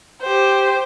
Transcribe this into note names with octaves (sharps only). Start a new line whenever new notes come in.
G4 C5